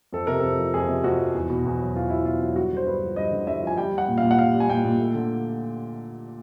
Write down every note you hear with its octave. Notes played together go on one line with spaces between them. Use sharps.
F2 A4
C3 A#4
F2 A4
F3
F2 G#4
C3
F2 F#4
F3
E2
B2
E2
F#3
E2 F4
B2 E4
E2 F4
F#3 F4
G2 F#4
D3 C5
G2 B4
F3
G2 D#5
D3
G2 E5
F3 G#5
G3 G5
G3 F#5
A#2
F5
A#2
F#5
G3 F5
G3
G#5
A#2 G5
A#2
A3
D3